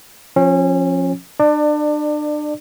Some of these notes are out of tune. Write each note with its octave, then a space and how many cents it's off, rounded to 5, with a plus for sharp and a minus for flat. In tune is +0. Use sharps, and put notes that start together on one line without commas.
F3 +15 C#4 -25
D4 +35 D5 +20